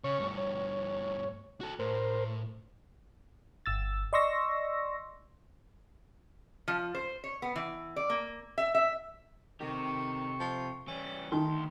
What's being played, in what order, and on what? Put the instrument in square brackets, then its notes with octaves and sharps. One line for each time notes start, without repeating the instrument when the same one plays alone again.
[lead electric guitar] C#3 [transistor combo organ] C#5 C#6
[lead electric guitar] G2 A3
[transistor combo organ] C#5
[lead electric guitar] F#4 A4
[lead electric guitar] A2 [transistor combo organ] A#4 C5
[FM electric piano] G1 E6 A6
D5 D#5 C6 C#6 E6 A#6
[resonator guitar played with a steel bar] F3
C5
C#5
B3
E3
D5
A#3
E5
E5
[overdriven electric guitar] C3 G4 [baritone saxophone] D#3 [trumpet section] A4 C#6
[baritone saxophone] F3
[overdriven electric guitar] E3 G3 [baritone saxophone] C#4
[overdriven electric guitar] D2 C6 [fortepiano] D#3 [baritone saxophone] A3